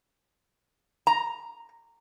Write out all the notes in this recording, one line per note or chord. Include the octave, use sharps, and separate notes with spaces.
A#5